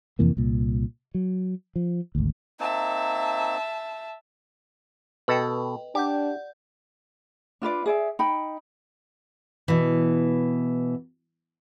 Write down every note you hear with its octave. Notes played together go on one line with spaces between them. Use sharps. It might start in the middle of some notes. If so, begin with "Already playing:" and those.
F2 C3 E3 A#3
C2 A#2
F#3
F3
G#1 D2
A#3 C4 D#4 E5 A5
B2 A4 B4 D#5 G5
D4 G4 D5 F#5 G6
D4 F4 B4 D5
G#4 D5 E5
D#4 G5 B5
B2 E3